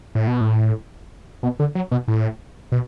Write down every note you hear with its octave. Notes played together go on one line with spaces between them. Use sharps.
A2
B2
A2
B2
D3
F#3
B2
A2
B2